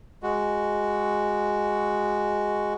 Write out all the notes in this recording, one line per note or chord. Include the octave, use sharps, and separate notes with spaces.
G#3 F#4